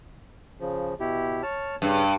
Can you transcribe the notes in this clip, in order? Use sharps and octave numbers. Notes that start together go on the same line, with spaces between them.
C#3 F3
B2 E4 G4
C#5 A5 F6
G2 C#3